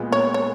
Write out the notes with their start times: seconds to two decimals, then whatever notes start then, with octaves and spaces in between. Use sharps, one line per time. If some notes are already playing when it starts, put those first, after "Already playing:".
Already playing: A#2 G#3 B3
0.12 C#5
0.34 C#5